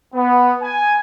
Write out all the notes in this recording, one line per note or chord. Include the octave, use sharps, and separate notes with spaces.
B3
G#5